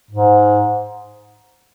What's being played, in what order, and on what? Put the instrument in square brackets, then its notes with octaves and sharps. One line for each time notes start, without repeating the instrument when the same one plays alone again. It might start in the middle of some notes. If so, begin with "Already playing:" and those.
[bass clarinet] G#2